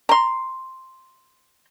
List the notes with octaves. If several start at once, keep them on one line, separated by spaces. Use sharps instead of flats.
A#5 C6